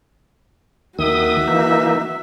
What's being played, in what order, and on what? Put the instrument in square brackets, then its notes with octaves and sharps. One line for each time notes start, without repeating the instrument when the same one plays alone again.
[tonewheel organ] D#2 D#3 D#6 [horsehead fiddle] F#4 E5
[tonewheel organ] E3 A#3 D#4